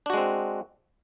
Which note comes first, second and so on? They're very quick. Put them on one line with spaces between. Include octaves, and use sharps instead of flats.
D4 F#4 G#3 C4